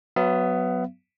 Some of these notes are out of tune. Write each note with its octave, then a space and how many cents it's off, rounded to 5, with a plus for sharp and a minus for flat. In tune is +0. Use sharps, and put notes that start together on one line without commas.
F#3 +0 B3 +15 E5 +45